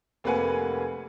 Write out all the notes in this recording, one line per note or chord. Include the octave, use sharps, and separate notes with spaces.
F1 A#3 C4 B4 F#5 G#5